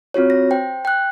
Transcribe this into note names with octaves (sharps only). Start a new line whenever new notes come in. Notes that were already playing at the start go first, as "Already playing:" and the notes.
C4 F4 F#4 C#5
A#6
C5 G5
G5 F#6